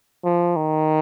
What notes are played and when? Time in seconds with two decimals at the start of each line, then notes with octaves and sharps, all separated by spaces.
0.24 F3
0.56 D#3